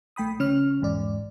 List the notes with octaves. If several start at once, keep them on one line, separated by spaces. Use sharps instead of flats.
A#1 A3 G5 B5 D#6
A#1 C#3 C#4 C#5 F6
A#1 E2 G#2 D5